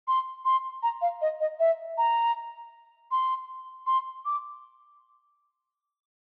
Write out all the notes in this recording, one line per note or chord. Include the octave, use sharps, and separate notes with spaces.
C6
C6
A#5
F5
D#5
D#5
E5
A#5
C6
C6
D6